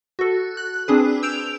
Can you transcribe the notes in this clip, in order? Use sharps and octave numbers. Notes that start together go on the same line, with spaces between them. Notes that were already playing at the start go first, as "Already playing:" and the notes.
F#4 A4
F#6
C4 D4 G#4 B4
E6 G6 D7 F7